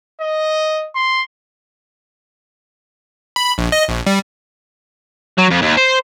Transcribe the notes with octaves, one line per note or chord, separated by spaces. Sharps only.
D#5
C6
B5
A#1
D#5
A#1
G3
F#3
F2
D#2
C5